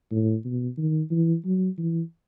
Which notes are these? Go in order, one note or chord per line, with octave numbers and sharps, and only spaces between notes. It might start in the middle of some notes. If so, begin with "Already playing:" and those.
A2
B2
D#3
E3
F#3
E3